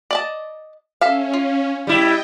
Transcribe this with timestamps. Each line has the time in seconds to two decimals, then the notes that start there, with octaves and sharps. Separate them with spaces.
0.11 D5 D#5 A5
1.01 C#4 A4 E5 F5
1.34 F4
1.87 G3 E4 D#5 G5